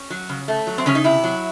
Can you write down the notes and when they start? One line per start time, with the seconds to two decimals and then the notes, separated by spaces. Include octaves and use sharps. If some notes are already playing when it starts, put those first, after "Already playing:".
Already playing: C#4
0.10 F#3
0.29 C#3
0.48 A3
0.67 F#3
0.78 C4
0.86 C#3 C#4
0.95 D#4
1.04 C3 E4
1.24 F#3